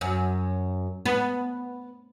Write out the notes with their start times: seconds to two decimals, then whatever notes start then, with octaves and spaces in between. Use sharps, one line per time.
0.01 F#2
1.05 B3